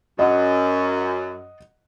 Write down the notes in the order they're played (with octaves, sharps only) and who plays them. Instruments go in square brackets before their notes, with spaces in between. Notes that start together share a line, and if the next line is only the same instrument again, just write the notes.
[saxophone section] F#2 [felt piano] D#5 F#5